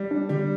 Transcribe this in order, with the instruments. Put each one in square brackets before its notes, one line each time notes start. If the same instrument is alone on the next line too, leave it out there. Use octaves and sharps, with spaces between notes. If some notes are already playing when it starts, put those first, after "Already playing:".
Already playing: [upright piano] G3
[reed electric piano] D4
[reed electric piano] D3 [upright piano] G3